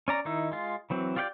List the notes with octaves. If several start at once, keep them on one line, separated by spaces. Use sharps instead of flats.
C#4 D5 A#5
D#3 D#4 E4
G#3 F4
E3 F#3 C4
F4 G4 D5 F5 G5